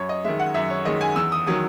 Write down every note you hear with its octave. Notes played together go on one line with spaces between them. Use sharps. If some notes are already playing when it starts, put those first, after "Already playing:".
Already playing: F#2 C#5
D#5
D#3 G#3 E5
F#5
F#2 E5
C#5
D#3 G#3 D#5
G#5
E2 E6
D#6
D#3 F#3 D#6